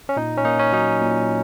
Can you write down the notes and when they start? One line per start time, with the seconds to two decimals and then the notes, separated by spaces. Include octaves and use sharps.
0.09 C#4
0.16 A#2 D#4
0.38 C#4
0.45 A#3 D#4
0.59 C#4
0.73 F#3 D#4
1.02 A#2